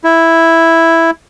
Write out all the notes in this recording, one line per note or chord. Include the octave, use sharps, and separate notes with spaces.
E4